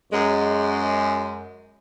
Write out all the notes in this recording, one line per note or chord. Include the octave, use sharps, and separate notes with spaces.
F#2 G#3